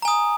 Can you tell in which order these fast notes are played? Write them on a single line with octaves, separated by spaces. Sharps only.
A#5 G#5 D#6